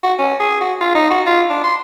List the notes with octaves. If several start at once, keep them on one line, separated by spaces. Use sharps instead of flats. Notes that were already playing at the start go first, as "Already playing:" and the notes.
F#4
C#4
G#4
F#4
F4
D#4
F#4
F4
D4
C6